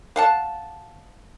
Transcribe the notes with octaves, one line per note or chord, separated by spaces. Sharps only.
F5 F#5 A5